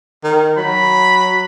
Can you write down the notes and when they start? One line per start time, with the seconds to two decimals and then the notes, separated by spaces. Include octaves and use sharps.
0.24 D#3
0.57 F#3 B5